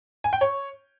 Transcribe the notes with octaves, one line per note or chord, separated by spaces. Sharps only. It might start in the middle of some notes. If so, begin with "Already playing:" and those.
G#5
G5
C#5